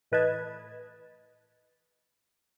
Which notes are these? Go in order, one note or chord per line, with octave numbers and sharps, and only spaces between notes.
A2 E3 B4 D#5 A5 G#6